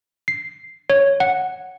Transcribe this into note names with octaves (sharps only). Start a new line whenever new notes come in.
C7
C#5
F#5